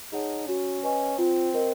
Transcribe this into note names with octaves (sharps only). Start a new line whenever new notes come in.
D#4 G#4 C#5 F#5 A5
C#4 F#4
B4 D#5 G#5 C#6
C4 F4
A#4 D#5